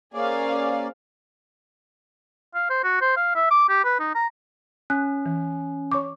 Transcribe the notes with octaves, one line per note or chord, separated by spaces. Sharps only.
A#3 C#4 G#4 C5 D5 F5
F5
C5
F#4
C5
F5
E5
D6
G4
B4
D#4
A#5
C#4 F#6
E3
C#5 C#6 D6